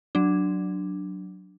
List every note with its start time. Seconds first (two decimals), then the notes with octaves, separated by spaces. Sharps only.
0.15 F#3 D4